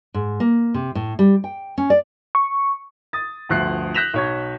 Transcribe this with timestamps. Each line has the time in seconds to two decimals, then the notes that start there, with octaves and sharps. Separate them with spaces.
0.14 G#2
0.40 A#3
0.74 C3
0.95 A2
1.19 G3
1.44 G5
1.78 C#4
1.90 D5
2.35 C#6
3.13 D#6 A6
3.49 G1 D2 F3 F#6 C7 F#7
3.94 F#6 G6 A#6 B6 E7 F7
4.14 B1 C#5 G#6